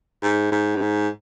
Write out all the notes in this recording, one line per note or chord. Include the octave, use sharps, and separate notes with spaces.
G#2
G#2
G2
G#2